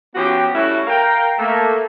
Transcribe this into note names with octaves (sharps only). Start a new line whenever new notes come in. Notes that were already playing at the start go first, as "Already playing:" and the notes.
F3 B3 C#4 F#4 G4
G3 A3 C#4 E4 F#4
A#4 F5 G5
A3 A#3